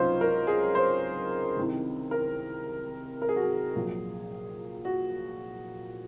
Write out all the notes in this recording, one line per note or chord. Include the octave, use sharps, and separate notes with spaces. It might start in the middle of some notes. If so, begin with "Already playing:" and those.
Already playing: C#2 C3 F#3 C#4 D#4 F4 C5
A#4
G#4
C5
C2 C3 D#3
A#4
A#4
G#4
F#4
G#4
A#1 A#2 F#3
F#4